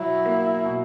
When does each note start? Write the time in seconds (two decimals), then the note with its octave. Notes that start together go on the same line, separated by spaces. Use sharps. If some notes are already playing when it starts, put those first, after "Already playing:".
Already playing: B2 F#3 E4
0.26 A#3
0.65 B2